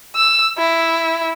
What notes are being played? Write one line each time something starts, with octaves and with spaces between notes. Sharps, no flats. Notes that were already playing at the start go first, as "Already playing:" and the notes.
E6
E4